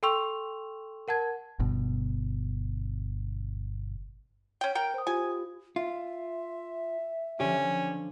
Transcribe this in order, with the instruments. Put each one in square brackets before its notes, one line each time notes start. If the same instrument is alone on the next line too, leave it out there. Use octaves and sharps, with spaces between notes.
[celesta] A4 G5 C6 C#6 E6 F7
A#4 F#5 A5 G#6
[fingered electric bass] G1 B2
[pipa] C#4 G5
A#4 G5
[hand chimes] C5 D#6
[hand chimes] F4 G4 [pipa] G#5
[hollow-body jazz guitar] F4 [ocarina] E5
[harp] D3 F3 [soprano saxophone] C#4 [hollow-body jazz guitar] G4